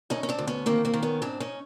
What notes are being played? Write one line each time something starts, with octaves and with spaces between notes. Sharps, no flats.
D2 C#4 D#4
C#4
C4 D4
D2
B3 C#4
D#3 A#3 C4
A#3 C4
D#3
B3 C#4
G#2 C4 D4
C#4 D#4